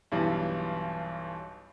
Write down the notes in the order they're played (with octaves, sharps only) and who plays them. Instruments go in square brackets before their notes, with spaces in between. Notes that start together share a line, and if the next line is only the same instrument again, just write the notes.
[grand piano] B1 G2 E3